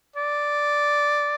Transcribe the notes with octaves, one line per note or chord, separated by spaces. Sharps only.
D5